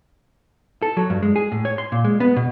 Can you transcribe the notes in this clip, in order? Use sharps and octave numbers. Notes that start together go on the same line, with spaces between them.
A4
F#3
G2
G#3
G#4
A2
C#5
C6
A#2
G#3
B3
B2